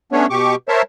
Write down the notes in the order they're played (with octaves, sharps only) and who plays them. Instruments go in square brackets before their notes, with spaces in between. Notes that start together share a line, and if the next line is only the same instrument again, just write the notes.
[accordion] A3 B3 C#4 D4 C#5
B2 G4 C#6 D6
A#4 C5 C#5 E5 A5